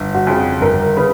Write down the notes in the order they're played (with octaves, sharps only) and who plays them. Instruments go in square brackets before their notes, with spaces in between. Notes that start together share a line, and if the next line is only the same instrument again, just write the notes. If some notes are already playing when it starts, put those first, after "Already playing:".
Already playing: [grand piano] G1
[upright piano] F#4
[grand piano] F2 C#3
[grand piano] G1 [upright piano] A#4
[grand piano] C#3 [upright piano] B4